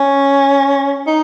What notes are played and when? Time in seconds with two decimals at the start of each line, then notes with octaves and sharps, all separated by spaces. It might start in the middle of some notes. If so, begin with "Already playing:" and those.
Already playing: C#4
1.07 D#4